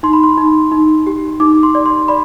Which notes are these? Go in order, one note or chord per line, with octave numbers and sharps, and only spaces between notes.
D#4 C6
B5
C6
D#4
D#4
G4
D#4 D6
C6
D5
C6
D5 B5